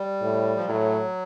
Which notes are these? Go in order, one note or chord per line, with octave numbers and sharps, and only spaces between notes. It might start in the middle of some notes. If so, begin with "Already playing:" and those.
Already playing: G3
A2
F3
A2 F#3